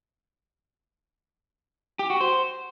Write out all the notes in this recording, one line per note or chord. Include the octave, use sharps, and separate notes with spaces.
G4
F#4
C5